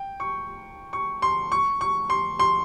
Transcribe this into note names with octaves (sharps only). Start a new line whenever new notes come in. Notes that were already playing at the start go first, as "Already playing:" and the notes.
Already playing: G5
C#6
C#6
C6
C#6
C#6
C6
C6